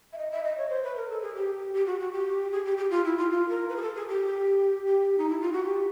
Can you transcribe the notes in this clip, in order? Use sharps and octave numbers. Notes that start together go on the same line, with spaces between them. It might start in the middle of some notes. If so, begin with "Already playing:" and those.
E5
D#5
E5
D#5
C#5
C5
B4
A#4
A4
G#4
G4
G4
F#4
F#4
G4
G#4
G4
G4
F4
E4
F4
F4
A#4
B4
G#4
A4
G#4
G4
G4
D#4
E4
F4
F#4
G4